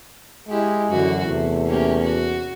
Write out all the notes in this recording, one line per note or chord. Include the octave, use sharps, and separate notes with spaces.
G#3 E4 G4
F#2 D3 E3 F#4
E2 C3 A3
A#3 C#4 G4
F#4